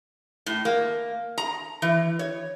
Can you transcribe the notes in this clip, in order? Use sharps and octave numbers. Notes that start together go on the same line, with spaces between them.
A2
A#3
A#5
E3
C#5